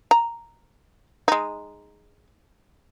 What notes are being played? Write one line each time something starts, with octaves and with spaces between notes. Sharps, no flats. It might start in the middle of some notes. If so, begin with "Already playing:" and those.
A#5
G#3 D#4